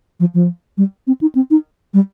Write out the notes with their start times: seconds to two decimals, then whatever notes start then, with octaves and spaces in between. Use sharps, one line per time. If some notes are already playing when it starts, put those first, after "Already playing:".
0.20 F3
0.34 F3
0.78 G3
1.07 C4
1.21 D#4
1.35 C4
1.51 D#4
1.94 G3